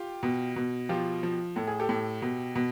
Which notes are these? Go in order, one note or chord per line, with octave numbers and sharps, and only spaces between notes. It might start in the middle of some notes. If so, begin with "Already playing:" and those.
Already playing: F4 G4
B2
B2
F3 F4 G4
F3
A2 A4
G#4
G4 A4
A2
B2
B2